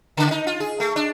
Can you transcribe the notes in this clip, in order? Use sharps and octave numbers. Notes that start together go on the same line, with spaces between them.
C#3
D#4
F4
G#4
A3
D4